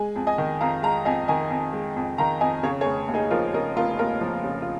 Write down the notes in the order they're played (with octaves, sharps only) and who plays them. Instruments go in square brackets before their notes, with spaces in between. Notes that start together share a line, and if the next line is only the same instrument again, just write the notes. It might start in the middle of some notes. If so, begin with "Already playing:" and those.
Already playing: [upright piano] G#3 G#5
F2
D#5 G#5
D#3
F2 F5 A#5
G#3 F5 A#5
F2 D#5 G#5
D#3 D#5 G#5
F2
G#3
F2
D#3 F5 A#5
F2 D#5 G#5
C#3 C#5 F5
G#4 C#5
F1
D#2
D#4 G#4
F3 F4 A#4
C#3 A#4 D#5
F1 F4 A#4
D#2 F4 A#4
F3
C#3
F4